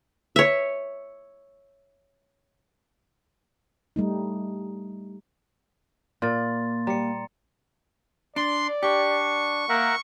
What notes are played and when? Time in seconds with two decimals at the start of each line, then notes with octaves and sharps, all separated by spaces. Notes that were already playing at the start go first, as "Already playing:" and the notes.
0.36 C#5 E5
3.96 G3 A3 D#4
6.22 A#2 A#3 C6 A6
6.87 G3 A#5 C#7
8.36 D4 D5 C6
8.83 D4 G4 C#6
9.69 A#3 A#4 E5 F#5